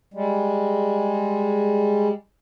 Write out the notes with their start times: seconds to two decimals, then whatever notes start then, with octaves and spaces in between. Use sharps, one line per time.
0.14 G3 G#3